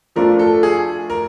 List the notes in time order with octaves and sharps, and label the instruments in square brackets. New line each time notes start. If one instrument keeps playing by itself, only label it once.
[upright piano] F3 A3 D4 F4 [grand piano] A#4
[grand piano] A4
G#4
A#4